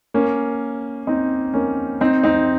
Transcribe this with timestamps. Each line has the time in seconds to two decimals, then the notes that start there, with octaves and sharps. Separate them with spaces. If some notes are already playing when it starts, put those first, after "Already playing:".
0.14 A#3 C#4
1.07 C4 D#4
1.54 A#3 C#4
2.01 C4 D#4
2.24 C4 D#4